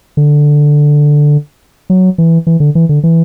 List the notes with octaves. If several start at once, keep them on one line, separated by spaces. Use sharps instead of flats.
D3
F#3
E3
E3
D3
E3
D3
E3